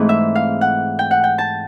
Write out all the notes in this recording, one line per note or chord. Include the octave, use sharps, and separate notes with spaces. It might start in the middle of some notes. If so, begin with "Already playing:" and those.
Already playing: G#2 E3 A3 C4
E5
F5
F#5
G5
F#5
G5
A5